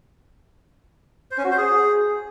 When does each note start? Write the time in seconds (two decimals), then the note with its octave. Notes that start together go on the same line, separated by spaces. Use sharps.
1.31 C5
1.38 C#4
1.44 F#4
1.51 C5
1.58 G#4